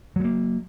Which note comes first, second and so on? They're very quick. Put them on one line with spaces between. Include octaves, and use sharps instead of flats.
F#3 G#3 A#3